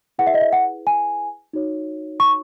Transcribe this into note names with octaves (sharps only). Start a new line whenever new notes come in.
E4 G#4 B4 F#5
E5
D#5
E5
F#5
G#5
D#4 F#4 C#5
C#6